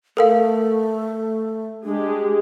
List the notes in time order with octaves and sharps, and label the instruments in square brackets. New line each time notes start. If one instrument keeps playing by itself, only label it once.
[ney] A3 [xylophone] A4 A#4 F5
[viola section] G#3 G4 G#4 [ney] D4